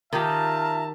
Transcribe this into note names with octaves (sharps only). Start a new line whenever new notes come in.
D#3 D#4 F4 G4 E5 A5 A#5